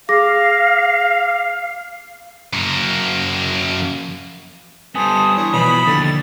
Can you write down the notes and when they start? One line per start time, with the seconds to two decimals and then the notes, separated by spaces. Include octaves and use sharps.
0.09 G#4 F5 D6 A#6
2.53 F#2 A#3
4.95 G3 B3 A4 C5 G#5 D#6
5.35 E3 D4 C#5
5.53 B2 E3 F3 B5
5.87 D#2 D3 A6